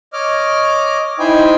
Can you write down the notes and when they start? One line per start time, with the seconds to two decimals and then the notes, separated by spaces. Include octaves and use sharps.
0.13 C#5 D#5 D6 F6
1.19 D#4 E4 C5 G5 G#5